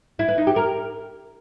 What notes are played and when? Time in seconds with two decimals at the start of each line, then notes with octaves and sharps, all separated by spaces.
0.19 E4
0.28 B4
0.38 D#4
0.47 G4
0.56 A#4